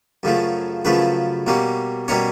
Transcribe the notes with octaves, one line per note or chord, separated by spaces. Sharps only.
F#2 C#3 F3 A3
F#2 C#3 F3 A3 B4
B2 G3 A#3 C#4
B2 G3 A#3 C#4 C#5